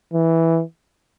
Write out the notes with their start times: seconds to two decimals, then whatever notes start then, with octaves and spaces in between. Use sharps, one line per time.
0.13 E3